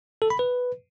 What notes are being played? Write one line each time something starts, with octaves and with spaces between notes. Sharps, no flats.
A4
B5
B4